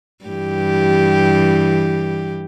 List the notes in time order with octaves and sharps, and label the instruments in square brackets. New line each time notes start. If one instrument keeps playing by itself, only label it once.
[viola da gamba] G2 E3 G4